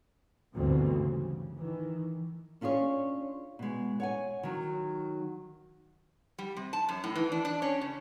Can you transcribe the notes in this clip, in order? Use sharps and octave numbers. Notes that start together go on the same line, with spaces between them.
G#1 D2 G2 B2 E3 C4
C#3
D#3 E3
C#4 D4 F4 G#4 C#5
B2 G#3
C#5 F#5 G#5
D#3 F#3
G3
C3
A5
F#2
A2
E3
D4
D4
C#4
C#3